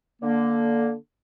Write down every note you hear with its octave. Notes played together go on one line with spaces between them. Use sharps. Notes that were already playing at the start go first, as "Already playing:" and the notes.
D3 A#3